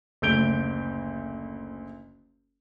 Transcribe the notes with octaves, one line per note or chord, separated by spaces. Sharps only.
F#1 D2 G6 D7 G7